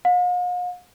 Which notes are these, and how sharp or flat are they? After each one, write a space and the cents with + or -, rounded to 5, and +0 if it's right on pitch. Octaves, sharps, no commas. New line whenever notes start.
F5 +45